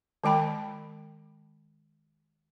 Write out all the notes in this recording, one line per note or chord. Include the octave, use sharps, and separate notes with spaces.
D#3 G#3 G5 B5